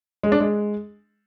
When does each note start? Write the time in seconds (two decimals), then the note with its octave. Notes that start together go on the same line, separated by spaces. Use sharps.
0.23 G#3
0.32 D4
0.40 G#3